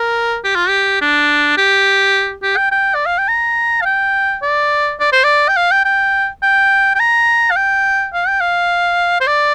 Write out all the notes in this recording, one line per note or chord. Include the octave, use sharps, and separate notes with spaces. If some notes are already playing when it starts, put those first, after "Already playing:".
Already playing: A#4
G4
F4
G4
D4
G4
G4
G5
G5
D5
F5
G5
A#5
F5
G5
D5
D5
C5
D5
G5
F5
G5
G5
G5
G5
A#5
F5
G5
F5
G5
F5
C5
D5